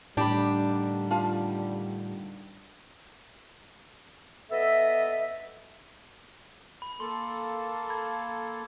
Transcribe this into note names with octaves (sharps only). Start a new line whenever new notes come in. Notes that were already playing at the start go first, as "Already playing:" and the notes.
A2 D3 D#3 G3 D4 G4 B5
F4 F5 A5
B3 A4 D#5 E5
B5
A#3 A4 C6
B5 G#6